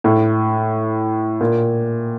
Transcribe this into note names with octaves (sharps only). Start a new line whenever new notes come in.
A2
A#2